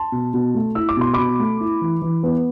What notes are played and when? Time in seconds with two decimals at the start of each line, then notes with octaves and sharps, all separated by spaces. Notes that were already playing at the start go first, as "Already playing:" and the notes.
Already playing: A5 C6
0.12 B2
0.34 B2
0.55 A3
0.75 E4 E6
0.89 D6
0.97 B2 C6
1.14 B2 B5 D6
1.40 A3
1.60 E4
1.81 E3
2.02 E3
2.23 B3